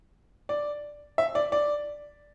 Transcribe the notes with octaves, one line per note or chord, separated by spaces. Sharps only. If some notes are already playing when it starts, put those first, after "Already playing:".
D5
E5
D5
D5